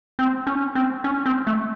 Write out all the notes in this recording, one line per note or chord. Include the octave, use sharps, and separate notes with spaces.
C4
C#4
C4
C#4
C4
A3